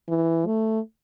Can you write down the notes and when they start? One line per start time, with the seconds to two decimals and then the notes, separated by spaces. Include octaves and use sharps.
0.09 E3
0.46 A3